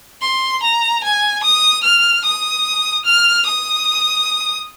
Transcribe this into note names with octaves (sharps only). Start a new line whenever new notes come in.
C6
A#5
G#5
D#6
F6
D#6
F6
D#6